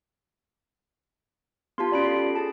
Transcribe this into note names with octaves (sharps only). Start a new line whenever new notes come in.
B3 F4 G4 A5 C6
C#4 F#4 G4 D5 B5 D7
A4 C7
G#4 A5